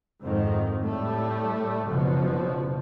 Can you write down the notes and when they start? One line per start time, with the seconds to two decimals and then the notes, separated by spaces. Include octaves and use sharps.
0.23 F2 G#2 D#3
0.82 A2 G3 A3
1.89 F#1 B2 F3